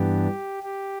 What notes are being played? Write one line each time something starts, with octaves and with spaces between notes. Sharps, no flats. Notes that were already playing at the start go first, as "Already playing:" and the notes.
Already playing: G2 E3 B3 D4 G4
G4